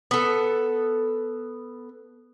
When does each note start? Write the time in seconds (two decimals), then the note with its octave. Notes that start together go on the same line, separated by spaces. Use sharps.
0.11 B3 A4